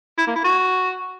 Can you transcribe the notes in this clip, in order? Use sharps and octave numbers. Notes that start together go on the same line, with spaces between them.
E4
A#3
E4
F#4